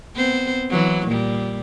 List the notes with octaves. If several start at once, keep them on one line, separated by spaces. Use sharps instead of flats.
B3 C4 C5
E3 F#3
A#2 G3